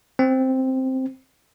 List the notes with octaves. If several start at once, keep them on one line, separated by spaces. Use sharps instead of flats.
C4